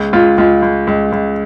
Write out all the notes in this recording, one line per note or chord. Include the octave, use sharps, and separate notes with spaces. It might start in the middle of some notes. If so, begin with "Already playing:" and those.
Already playing: C#2
C#2 F4
C#2 F4
C#2
C#2
C#2